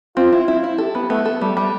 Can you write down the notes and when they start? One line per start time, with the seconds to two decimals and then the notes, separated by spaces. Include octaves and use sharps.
0.17 C4 F4
0.33 E4
0.48 E4
0.64 E4
0.78 G4 A4
0.95 B3
1.10 A3 B3
1.25 A4
1.41 G3 A3
1.57 G3